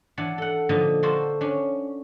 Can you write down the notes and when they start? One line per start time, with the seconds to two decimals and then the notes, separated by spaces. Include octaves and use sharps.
0.17 E3 D4 F#5 A5
0.38 A4 F#5
0.69 A#2 D3 F3 D#4 D#5
1.03 D4 F4 F#4 A4 A#4 C5
1.41 C#4 D4